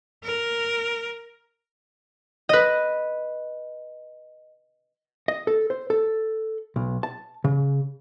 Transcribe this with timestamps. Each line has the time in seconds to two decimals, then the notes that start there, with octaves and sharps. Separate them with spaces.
0.24 A#4
2.49 B4 D#5
5.28 D#5
5.47 A4
5.70 C5
5.90 A4
6.76 B1
7.03 A5
7.44 C#3